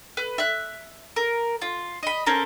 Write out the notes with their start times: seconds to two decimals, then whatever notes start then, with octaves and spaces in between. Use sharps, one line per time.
0.17 B4
0.38 E5 F#6
1.16 A#4
1.62 F4
2.03 D#5 B5
2.26 C4 C#4 A4 A#4